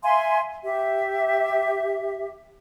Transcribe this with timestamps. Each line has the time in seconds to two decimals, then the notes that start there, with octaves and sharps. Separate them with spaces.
0.03 E5 F5 G#5 C6
0.64 G4 E5